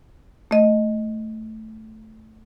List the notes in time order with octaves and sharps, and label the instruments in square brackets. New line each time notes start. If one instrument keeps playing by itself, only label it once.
[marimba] A3 D#5